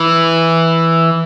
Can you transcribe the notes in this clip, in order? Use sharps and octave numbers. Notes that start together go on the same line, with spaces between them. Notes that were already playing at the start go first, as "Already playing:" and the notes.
Already playing: E3